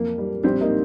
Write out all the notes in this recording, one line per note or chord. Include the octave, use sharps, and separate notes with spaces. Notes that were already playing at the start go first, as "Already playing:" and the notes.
Already playing: F2 A#3
G3
A#1 G3 C4
A#3 D#4